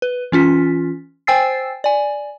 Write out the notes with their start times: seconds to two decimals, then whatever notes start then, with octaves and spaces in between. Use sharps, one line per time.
0.02 B4
0.32 E3 C#4 F4 B6
1.27 C5 G5 G#5 E6 A6 C7
1.84 D5 G#5